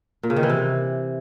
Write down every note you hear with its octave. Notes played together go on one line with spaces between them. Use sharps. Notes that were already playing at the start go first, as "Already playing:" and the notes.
A#2
C#3
D#3
E3
C3